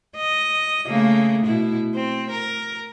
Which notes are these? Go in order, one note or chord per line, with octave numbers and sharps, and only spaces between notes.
D#5
C#3 A3 A#3
B2 E4
C4
A#4